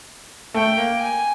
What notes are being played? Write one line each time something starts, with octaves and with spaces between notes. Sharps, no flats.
A3 G5
A#3
G#5